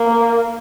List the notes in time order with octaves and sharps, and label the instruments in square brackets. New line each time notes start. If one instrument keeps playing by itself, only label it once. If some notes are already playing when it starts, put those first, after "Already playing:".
Already playing: [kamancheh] A#3